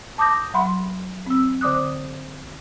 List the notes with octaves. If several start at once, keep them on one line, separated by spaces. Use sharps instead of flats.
A5 D6 D#6 G6 A#6
F#3 F#5 B5 C6
C4 E6
D3 D5 D6 D#6 F#6